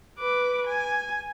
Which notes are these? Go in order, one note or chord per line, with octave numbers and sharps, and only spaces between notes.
B4 D6
G#5